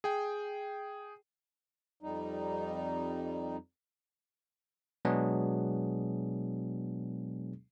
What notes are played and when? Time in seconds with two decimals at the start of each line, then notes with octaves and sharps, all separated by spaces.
0.04 G#4 G5
2.01 F2 G3 D#4
5.05 B2 F#3 G#3 B3 D4 G#4